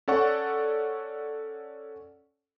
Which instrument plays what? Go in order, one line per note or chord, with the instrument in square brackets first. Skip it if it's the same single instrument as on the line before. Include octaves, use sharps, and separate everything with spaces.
[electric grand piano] C#4 A4 D5 F#5 C#6